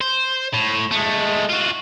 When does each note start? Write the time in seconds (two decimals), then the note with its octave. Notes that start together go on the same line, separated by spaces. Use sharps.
0.01 C5
0.54 A2
0.91 G#3 A3
1.49 F4 F#4